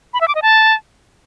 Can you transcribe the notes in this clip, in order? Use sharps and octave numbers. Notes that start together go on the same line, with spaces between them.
B5
E5
D6
D#5
A5